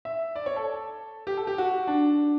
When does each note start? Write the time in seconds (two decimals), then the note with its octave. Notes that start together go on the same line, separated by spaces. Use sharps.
0.05 E5
0.36 D5
0.46 C#5
0.56 A4
1.27 G4
1.37 A4
1.47 G4
1.58 F#4
1.87 D4